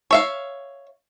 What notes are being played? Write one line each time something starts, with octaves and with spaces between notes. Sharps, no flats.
C#5 E5 F5